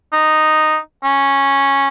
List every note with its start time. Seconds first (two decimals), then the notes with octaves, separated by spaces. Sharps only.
0.13 D#4
1.04 C#4